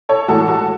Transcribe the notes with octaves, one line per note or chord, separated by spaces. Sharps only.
A4 C#5
A2 E3 G#3 F#4 A4
F#4 A4